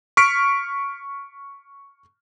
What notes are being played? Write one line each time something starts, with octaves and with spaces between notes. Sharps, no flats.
C#6 F6 B6 D7